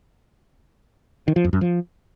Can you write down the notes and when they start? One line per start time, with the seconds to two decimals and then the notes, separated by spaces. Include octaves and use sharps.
1.28 D#3
1.36 F3
1.44 F2
1.53 F#2
1.61 F3